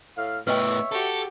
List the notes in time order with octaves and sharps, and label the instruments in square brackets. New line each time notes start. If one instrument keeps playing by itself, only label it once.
[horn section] A2 F5
[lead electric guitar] A2 B3 [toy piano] B4 D#5 G5 [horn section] C#5 E5
[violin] F#4 G4 [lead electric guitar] A4